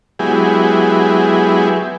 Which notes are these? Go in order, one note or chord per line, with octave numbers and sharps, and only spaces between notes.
F#3 G#3 B3 E4 G4 G#4